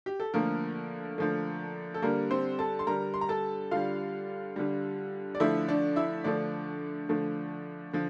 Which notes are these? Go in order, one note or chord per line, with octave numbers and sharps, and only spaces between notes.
G4
A4
D3 F3 A3 A#3 A#4
D3 F3 A3
A4
D3 G3 A#3 A#4
C4 C5
A4 A5
C6
D3 G3 A#4 A#5
C6
A#5
A4 A5
D3 G3 F4 F5
D3 G3
D5
D3 F3 A3 E4 E5
D4 D5
E4 E5
D3 F3 A3 D4 D5
D3 F3 A3
D3 F3